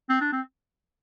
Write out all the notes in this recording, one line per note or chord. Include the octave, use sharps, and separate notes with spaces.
C4
D4
C4